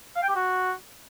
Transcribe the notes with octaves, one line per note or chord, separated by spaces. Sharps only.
F5
G5
G4
F#4